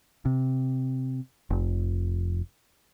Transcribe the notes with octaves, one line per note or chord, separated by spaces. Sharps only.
C3
F1